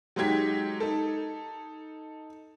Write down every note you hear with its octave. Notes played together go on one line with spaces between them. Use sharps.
F#3 G#3 D#4 G4 G#6 B6
D#4 A4